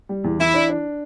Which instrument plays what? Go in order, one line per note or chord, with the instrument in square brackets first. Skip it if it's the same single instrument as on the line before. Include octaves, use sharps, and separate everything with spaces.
[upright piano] G3
E2
[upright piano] E3 [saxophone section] E4
[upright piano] D4
D4